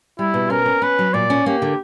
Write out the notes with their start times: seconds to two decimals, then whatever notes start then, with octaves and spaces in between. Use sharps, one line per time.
0.19 G3 E4
0.34 B2
0.50 C#4 A#4
0.66 C#4
0.82 C#4 B4
0.99 F#3
1.14 A#2 D5
1.30 C#4
1.46 A#3 G4
1.62 D3